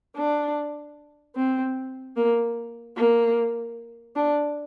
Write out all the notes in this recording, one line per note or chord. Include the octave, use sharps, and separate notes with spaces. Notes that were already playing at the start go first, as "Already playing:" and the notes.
D4
C4
A#3
A#3
D4